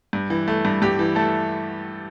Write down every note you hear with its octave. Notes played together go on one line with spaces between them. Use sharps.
G2
E3
A3
G2
G2 G4
E3
A3 A4